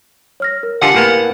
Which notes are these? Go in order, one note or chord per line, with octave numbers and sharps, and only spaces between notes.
C#5 F6 A#6
A#4
D3 F4 G4 F#5 G#5 A5
A2 A#3 B3